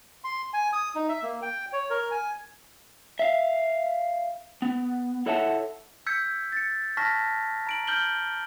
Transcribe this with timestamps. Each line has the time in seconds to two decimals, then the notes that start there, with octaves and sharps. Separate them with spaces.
0.24 C6
0.53 G#5
0.73 D#6
0.95 D#4
1.09 E5
1.23 A#3
1.42 G5
1.73 C#5
1.90 A#4
2.11 G#5
3.19 E5 F5
4.62 B3
5.26 E4 A4 C#5 E5 F#5 A5
6.06 E6 G6 G#6 B6 C#7
6.52 A6 C#7
6.97 A5 C#6 F6 A#6 B6
7.67 A#5 D7 F#7
7.87 F6 G6 D7 F#7 G7